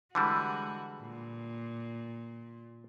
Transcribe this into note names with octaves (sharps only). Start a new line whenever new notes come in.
D3 E3 G3 G#3 F#4
A#2